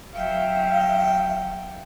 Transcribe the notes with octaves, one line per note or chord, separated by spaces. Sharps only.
D#1 F#3 E5 F5 G5